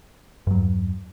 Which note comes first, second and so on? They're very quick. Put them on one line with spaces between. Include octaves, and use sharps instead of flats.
G2 F#3 E2